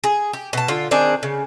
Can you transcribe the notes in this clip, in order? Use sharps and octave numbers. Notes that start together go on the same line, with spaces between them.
G#4
G4
B2 A5
D3 F4
D#3 C4 D4 G#4
C#3